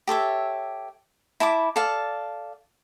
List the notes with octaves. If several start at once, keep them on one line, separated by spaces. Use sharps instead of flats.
G4 A4 C#5 E5
E4 A5 B5 D6
A4 D5 F5 A5